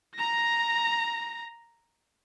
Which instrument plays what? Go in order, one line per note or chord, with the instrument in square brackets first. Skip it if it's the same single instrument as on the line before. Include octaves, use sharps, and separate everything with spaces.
[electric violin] A#5 A#6